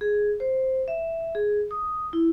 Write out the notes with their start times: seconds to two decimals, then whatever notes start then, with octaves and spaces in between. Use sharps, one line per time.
0.01 G#4
0.40 C5
0.88 E5
1.35 G#4
1.71 D#6
2.13 E4